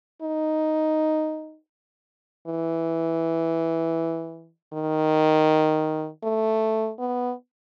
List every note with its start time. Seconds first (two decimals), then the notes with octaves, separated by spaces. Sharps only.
0.22 D#4
2.47 E3
4.73 D#3
6.24 A3
6.99 B3